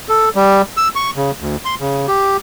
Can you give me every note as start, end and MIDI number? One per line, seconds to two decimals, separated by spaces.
0.09 0.29 69
0.35 0.62 55
0.77 0.88 88
0.96 1.11 85
1.16 1.31 49
1.41 1.56 38
1.65 1.75 84
1.80 2.07 49
2.08 2.37 67